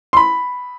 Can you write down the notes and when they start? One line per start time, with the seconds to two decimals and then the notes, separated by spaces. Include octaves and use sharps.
0.13 C6
0.17 B5